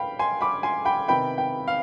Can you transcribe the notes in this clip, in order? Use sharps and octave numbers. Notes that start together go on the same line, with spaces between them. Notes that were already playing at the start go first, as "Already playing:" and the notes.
Already playing: B3 F5 G5 B5
G#5 C6
B5 D6
G#5 C6
G5 B5
C3 D#3 B3 G5 B5
G5
F5